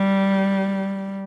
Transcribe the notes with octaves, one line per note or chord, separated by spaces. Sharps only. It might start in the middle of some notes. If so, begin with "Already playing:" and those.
Already playing: G3